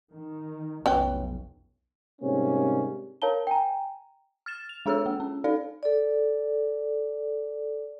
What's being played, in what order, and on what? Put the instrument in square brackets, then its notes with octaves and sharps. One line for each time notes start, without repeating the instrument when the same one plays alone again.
[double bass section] D#3
[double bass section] F1 B1 [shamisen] C#4 B4 G5
[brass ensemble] G#2 C3 G3 A#3 C#4
[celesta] A#4 C#5 F5 A5 A#5 G7
G5 G#5 A#5
[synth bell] F6 A6 E7
F7
G#3 D4 G#4 A4 C#5 E6
A#3
C#4
D#4 A4 D5 F5
[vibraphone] A4 D5